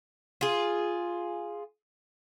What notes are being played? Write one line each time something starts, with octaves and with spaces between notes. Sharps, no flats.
F4 G#4